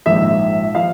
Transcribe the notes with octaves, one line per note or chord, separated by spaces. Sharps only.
A#1 G#2 F3 E5
F3 F5